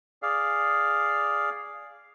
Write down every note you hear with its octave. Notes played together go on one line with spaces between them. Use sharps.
G#4 D5 F5